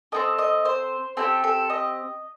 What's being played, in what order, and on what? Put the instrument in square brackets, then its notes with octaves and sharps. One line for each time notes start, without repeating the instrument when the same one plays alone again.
[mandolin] C4 F#4 A4 D#5
D#5
C5
C4 E4 G4 A4
A4
D#5